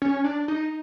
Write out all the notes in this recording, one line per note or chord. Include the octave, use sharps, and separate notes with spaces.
C#4
D4
D#4